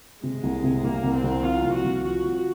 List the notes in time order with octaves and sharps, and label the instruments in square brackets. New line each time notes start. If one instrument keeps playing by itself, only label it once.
[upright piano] C3 [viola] G#3
[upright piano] C2
C3
[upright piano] C2 [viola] A#3
[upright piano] C2
[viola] C4
[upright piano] C2
[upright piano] F3 [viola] F4
[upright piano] C2
[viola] F#4
[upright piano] C2
[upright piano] F3 [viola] F#4
[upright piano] F3